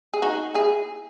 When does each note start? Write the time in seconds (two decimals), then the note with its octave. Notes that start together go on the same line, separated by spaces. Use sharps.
0.14 G#4
0.22 D#4 F#4
0.54 E4 G#4